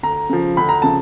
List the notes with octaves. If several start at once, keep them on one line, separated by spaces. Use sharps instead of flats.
D2 A#5
C#3 F3
D2 B5
A#5
C#3 F3 A5